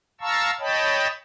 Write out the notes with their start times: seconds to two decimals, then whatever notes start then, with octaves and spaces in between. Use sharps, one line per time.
0.21 F5 A5 A#5 C#6 E6
0.60 C#5 D#5 G5 A5 B5